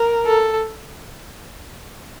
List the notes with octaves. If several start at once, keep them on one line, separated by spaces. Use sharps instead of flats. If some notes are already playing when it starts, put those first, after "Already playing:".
Already playing: A#4
A4